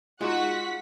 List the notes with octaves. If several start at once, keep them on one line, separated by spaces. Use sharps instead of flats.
G#3 D#4 F4 F#4 F#5 B6